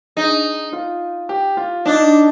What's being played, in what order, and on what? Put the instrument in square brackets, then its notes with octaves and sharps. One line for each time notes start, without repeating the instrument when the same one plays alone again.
[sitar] D#4 [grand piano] G#4
[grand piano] F4
G4
F4
[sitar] D4 [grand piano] D#4